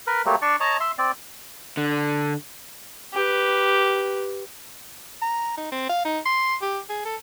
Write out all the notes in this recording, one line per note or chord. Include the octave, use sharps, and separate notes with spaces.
A#4 B4
F#3 G3 A3 A#3
D4 D5 C#6
C#5 D#5 A5 A#5
E5 C6
C4 D5
D3
G4 B4
A#5
D#4
C4
F5
D#4
C6
G4
G#4
A4